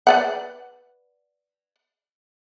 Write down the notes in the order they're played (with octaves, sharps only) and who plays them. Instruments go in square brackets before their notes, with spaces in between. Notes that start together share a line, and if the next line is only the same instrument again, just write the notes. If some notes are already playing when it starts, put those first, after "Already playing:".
[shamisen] B4 D5 F#5